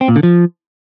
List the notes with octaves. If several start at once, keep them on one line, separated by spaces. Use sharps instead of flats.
C4
A#2
D3
F3